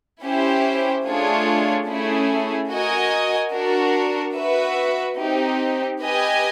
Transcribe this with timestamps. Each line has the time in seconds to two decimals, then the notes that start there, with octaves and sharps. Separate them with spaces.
0.24 C#4 E4 G4 C5
1.06 A3 D4 F4 G#4 C#5
1.88 A3 C#4 E4 G#4
2.70 F#4 A#4 D#5 G#5
3.53 D4 F#4 A#4
4.36 F#4 B4 E5
5.18 C4 D#4 G4
6.00 G4 B4 D#5 G#5